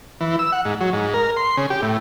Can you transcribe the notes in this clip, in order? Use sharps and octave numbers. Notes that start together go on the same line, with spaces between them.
E3
E6
F#5
G#2
F#3
G#2
A#4
C6
C#3
G4
A2